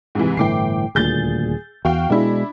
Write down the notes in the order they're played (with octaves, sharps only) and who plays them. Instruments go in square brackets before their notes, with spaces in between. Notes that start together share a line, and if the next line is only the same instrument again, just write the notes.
[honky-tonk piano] G#2 C3 E3
[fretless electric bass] G1 A2 E3 [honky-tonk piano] G5 D6 C7
[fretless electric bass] D#1 D2 A#2 [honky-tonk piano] G#4 G6 A6
[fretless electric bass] E2 [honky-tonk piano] F#4 F5 G5
[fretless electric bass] B2 G#3 [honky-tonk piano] D4 E4